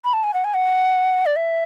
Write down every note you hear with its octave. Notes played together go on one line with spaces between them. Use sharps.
B5
A5
G#5
F#5
G#5
F#5
D5
E5